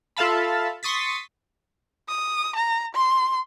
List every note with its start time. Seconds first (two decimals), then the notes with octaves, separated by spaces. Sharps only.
0.17 F4 A4 E5 F5 A5 B5
0.83 C6 C#6 D#6 A6 B6
2.09 D#6
2.55 A#5
2.94 C6